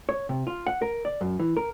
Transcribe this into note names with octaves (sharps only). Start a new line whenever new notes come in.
C#5
C3
F4
F#5
A#4
D5
F#2
E3
A#4